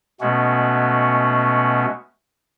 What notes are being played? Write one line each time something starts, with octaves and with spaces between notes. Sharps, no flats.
B2 G#3 A3 B3 C#4 F#4